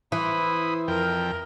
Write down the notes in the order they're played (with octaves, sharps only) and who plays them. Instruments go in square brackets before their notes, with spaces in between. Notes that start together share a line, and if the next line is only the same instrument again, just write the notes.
[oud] E3 [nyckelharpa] E4 C5 [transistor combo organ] B5 D#6
[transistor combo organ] F2 G5 [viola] A#4